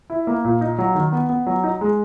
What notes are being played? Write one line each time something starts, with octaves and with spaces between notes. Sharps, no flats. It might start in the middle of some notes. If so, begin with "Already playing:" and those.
E4
A#3
A#2
D#4
F#3
D#3
B3
B3
F#3
D#4
G#3